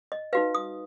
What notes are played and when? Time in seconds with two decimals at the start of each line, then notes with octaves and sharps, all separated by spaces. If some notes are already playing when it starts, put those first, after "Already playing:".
0.12 D#5
0.33 D#4 F#4 B4 F5
0.55 D#6